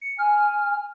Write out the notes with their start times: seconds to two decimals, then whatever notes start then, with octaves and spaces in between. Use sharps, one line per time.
0.01 C#7
0.19 G#5 F6